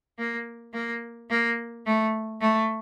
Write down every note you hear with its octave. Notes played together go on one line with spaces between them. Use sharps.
A#3
A#3
A#3
A3
A3